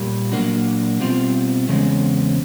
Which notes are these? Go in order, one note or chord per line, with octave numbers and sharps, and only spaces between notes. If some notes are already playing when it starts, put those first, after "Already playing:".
Already playing: A#2 G3 A#3
A#2 F#3 A#3 D4 F#4
B2 G3 C4 F4
E2 C#3 G#3 C4